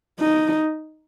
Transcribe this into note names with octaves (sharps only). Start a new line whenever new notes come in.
D#4